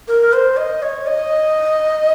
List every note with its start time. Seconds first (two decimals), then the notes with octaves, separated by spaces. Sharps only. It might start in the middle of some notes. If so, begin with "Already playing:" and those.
0.08 A#4
0.33 C5
0.57 D#5
0.82 C#5
1.07 D#5